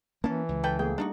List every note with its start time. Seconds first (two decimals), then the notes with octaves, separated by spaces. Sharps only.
0.24 E3 A#3 C#4 A5
0.49 C#2
0.64 A4 B4 G5
0.79 A3 A#3 G#4 G5
0.98 G3 D4 D#4 F#4